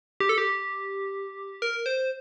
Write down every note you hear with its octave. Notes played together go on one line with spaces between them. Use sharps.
G4
A4
G4
A#4
C5